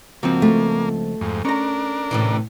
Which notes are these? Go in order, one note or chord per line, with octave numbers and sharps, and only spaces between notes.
C#2 F3 A#3 C4 F#4
A3
F2 G#2
C#4 D4 A#4 A#5
A2 C3 E3